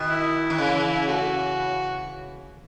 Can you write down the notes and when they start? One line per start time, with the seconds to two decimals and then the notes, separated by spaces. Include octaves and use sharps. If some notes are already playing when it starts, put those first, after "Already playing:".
Already playing: B2 D#3
0.09 E4
0.50 D#3
0.58 C#3 E3
1.08 A3 F#4